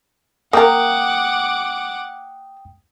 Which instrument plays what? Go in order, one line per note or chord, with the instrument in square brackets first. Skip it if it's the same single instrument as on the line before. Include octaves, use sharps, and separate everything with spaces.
[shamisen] A#3 A#4 [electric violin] F#5 D6 [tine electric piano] G5 D#6